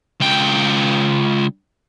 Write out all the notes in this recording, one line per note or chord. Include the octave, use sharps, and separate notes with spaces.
C#2 G5